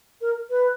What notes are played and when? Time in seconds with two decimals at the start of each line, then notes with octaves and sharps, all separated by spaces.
0.21 A#4
0.49 B4